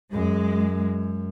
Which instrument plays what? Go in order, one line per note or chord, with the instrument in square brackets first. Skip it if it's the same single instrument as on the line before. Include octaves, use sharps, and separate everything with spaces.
[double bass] F#2 [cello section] G#3